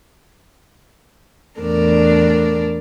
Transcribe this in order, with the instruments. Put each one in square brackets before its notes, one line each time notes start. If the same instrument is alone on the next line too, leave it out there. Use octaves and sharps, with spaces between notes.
[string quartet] E2 A2 D4 A#4 D5